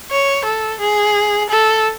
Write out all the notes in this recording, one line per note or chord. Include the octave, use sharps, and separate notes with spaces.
C#5
A4
G#4
A4